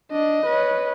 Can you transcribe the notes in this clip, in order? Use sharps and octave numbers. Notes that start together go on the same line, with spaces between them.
D4 D#5
B4 C#5